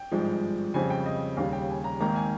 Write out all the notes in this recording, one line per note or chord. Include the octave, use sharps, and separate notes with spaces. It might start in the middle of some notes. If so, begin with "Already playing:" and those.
Already playing: G5
G#1 G2 F3 G#3
F2 C#3 G3 C4 G#5
G5
D#5
D#2 C#3 G3 F5
G5
G#5
A#5
G#1 G#2 D#3 A#3 A#5
G#5